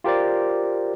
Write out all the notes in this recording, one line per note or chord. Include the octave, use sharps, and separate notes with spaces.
F4 G4 A#4 C5 D5